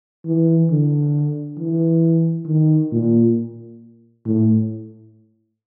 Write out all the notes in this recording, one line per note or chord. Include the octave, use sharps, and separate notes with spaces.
E3
D3
E3
D#3
A#2
A2